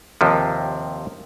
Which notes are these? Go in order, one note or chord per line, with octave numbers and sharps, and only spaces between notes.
D#2 C3 F3